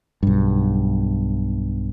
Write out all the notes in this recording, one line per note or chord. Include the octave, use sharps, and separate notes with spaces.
B1 G2